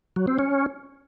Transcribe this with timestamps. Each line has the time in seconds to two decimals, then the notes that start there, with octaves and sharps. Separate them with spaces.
0.16 F#3
0.27 C4
0.39 C#4